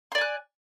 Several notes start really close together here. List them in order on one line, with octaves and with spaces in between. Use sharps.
C6 D5 G#5 F#6